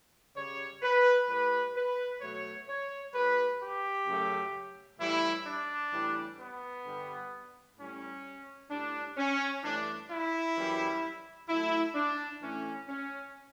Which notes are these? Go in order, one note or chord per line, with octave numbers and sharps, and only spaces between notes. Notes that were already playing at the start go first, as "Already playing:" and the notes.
C#3 G3 C#5
B4
A2 G3 B4
B4
B2 F#3 A3 C#5
C#5
A2 G3 B4
G4
F#2 C#3 F#3 A3
A2 E3 G3 E4
D4
A2 E3 G3
B3
G2 D3 G3
A2 G3 C#4
A2 G3 D4
C#4
G2 E3 A3 D4
E4
F#2 E3 G3
A2 F#3 A3 E4
D4
A2 E3 A3 C#4
C#4